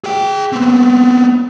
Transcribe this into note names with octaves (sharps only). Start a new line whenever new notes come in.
G#4 G5
B3 C4